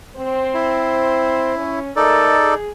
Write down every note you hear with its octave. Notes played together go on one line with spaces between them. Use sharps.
C4 C5
E4
C#4
G#3 A3 D#4 A4 A#4 D5
G#4